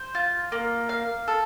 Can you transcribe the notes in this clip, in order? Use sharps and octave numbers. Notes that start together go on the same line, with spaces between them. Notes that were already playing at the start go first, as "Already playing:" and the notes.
Already playing: C5
F4
A#3
F5
A4